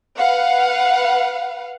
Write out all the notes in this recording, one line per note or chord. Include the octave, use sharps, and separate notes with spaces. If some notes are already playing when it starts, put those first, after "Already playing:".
B4 F5 F#5